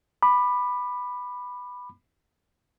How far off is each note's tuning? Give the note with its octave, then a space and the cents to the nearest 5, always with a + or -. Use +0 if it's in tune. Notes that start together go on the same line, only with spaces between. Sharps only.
B5 +0 D6 +30